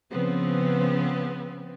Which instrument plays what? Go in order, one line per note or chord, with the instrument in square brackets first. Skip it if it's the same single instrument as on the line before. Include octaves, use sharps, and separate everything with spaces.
[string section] C#3 F3 B3 C4